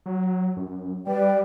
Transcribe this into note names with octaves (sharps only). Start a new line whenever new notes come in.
F#3
F#2
G3 B4 D5 G5